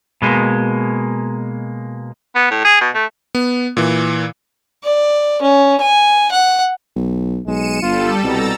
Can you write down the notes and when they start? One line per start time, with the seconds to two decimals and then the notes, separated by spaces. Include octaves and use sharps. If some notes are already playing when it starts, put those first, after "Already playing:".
0.22 B2 G#3 A#3
2.35 B3
2.51 A2
2.65 G#4
2.81 B2
2.95 A3
3.35 B3
3.77 A#2 E3
4.84 D5
5.42 C#4
5.81 G#5
6.31 F#5
6.96 B1
7.47 B1 G#3 C#7 D#7 E7
7.83 G1 G3 F4 A4
8.24 C2 B2 A#5 E6 A6